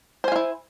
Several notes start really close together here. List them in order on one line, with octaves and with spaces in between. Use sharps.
C5 G#5 F4 E4